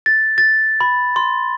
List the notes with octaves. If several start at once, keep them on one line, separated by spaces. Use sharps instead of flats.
A6
A6
B5
C6